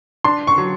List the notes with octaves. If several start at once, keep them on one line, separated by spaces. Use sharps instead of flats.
D4 C6
C#6
F#3